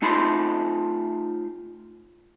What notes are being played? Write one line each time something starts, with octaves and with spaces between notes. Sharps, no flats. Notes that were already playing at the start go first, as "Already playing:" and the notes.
A3 D#4 F4 B5 C6